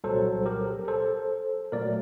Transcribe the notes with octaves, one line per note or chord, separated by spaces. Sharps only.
C2 A#2 F#3 A4 C5
G4 A#4
A4 C5
A#2 F#3 A3 A#4 D5